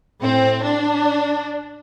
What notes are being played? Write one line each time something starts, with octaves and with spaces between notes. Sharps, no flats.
A2 C4
D4